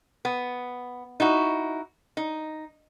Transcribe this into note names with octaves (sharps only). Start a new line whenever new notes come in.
B3
D#4 E4 F#4
D#4